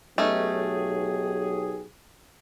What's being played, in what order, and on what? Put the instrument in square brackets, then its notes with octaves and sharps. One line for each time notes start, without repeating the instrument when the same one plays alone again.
[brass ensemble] B1 G4 G#4 [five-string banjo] A3 C#4 D#4